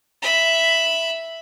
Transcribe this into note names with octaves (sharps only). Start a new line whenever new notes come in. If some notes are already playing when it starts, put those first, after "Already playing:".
E5 B5